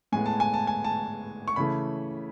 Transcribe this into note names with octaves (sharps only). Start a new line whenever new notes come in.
A2 G#3 B3 G#5
A5
G#5
A5
G#5
A5
C#6
C#3 E3 A3 B5